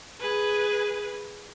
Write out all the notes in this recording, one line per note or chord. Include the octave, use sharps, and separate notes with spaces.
G#4 B4